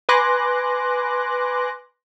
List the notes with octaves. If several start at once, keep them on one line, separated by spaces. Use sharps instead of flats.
B4 G#5 C6 D6 F#6 A#6